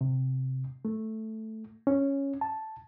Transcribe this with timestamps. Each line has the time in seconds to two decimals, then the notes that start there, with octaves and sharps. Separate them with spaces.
0.01 C3
0.85 A3
1.87 C#4
2.41 A5